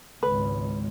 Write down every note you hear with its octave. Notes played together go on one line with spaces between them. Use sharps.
G#1 C#2 B4